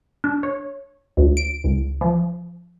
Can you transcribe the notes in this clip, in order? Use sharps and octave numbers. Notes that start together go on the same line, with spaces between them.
D4
C#5
D2
D7
C#2
F3